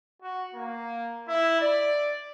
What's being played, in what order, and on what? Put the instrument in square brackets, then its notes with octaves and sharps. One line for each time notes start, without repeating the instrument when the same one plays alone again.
[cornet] F#4
A#3
E4
D5